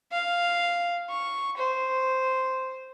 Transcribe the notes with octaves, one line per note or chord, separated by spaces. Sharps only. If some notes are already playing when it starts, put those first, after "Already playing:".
F5
C#6
C5